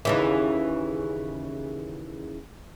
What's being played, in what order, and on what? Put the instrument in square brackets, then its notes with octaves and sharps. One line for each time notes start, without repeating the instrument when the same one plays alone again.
[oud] D#2 C#3 E3